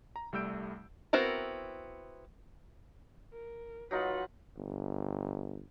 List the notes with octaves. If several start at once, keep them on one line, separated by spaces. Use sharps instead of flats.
A#5
C2 G3 A3 E6 G6 D7
B3 C4 E4 F#4 A#4
A#4
F#3 D#4 F4 B4 F#5
G1